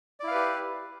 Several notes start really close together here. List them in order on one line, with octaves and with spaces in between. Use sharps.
D5 E4 F5 B4 G4